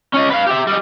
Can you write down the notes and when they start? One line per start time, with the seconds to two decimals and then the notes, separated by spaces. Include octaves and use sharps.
0.14 C#4 D#5
0.30 B4 F5
0.47 G4 E5
0.67 G3 D#5